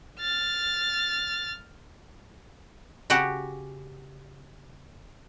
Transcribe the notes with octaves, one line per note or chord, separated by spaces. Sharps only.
F6 A6
C#3 F#4 G4 F#5